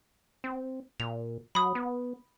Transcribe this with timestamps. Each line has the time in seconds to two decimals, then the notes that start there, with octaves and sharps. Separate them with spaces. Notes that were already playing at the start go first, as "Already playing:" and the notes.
0.44 C4
1.00 A#2 F7
1.55 F#3 B5 D#6
1.75 B3